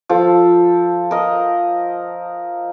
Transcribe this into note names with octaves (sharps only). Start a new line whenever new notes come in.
F3 A4
A#4 D#5